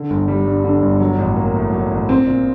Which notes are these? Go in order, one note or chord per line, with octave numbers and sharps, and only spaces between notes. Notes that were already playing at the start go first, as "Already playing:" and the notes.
Already playing: D3
G1
G3
G2
D3
G1
F#3
A1
A#3
A2
F#3
A1
C4
A#2